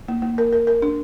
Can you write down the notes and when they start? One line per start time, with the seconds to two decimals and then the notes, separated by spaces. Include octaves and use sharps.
0.08 A#3
0.22 A#3
0.38 A#4
0.53 A#4
0.67 A#4
0.82 D4